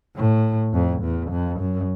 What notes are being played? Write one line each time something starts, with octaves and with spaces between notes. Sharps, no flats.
A2
F2
E2
F2
F#2